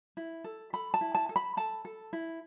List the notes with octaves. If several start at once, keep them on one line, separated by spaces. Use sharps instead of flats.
E4
A4
A4 B5
A5
E4
A5
A4
B5
A4 A5
A4
E4